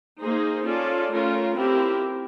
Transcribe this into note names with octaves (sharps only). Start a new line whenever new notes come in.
A#3 D#4 G#4 C5
C#4 F4 A4 D5
A3 C#4 F4 A#4
C4 E4 G4 A#4